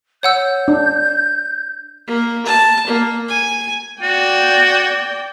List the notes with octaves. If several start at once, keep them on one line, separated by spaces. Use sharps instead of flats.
C#5 F#5 E6 G6
D4
A#3
A5
A#3
G#5
F#4 D5 G5